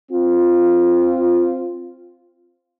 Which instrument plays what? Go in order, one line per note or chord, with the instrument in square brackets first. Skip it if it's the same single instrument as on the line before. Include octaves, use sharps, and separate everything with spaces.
[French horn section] C4 F4